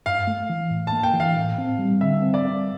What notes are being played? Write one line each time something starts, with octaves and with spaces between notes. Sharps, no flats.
G2 F5
A3
E3
A2
A5
A#3
G5
E3
F5
A2
C4
G3
D3 E5
C4
D5
G3